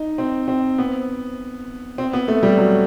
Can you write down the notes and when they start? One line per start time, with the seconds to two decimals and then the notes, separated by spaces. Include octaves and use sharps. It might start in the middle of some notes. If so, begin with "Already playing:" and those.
Already playing: D#4
0.18 C4
0.48 C4
0.78 B3
1.98 C4
2.13 B3
2.28 A3
2.43 G3
2.58 F#3